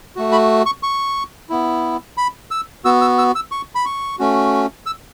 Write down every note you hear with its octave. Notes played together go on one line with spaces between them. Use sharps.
A3 F#4
B5
C#6
C#6
B3 E4
B5
E6
B3 F#4 E6
E6
E6
E6
C#6
B5
C#6
A3 C#4 F#4
E6